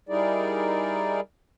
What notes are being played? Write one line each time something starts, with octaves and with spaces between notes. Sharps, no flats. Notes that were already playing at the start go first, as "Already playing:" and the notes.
G3 D#4 E4 G#4 A#4 D5